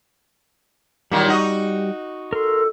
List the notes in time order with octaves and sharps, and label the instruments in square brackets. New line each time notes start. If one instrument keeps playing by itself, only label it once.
[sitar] A#2 D#3 F#3 [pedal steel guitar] G3
[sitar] D#4 F#4 D#5
[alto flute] A4 [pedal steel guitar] A#4 C6